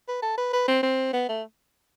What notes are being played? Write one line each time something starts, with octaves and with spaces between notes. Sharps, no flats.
B4
A4
B4
B4
C4
C4
B3
A3